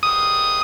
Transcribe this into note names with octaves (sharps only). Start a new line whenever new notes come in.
D#6